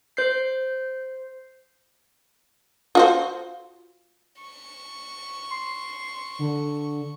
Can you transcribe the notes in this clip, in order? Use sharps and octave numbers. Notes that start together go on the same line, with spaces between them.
C5 G6 C7
F4 F#4 C5
C#6
C6
D3